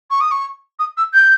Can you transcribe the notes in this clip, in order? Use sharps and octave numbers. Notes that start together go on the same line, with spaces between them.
C#6
D#6
C#6
D#6
E6
G6